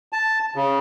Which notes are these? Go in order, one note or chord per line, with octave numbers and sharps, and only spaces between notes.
A5
C#3